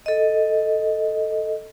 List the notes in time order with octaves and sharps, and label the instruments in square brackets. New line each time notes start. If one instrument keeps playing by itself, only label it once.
[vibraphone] A4 D#5